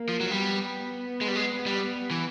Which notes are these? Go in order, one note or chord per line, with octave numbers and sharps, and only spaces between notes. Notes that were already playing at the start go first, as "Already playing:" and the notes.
Already playing: A#3
F3
F#3
G3 B3
G#3
G3
G#3
G3
E3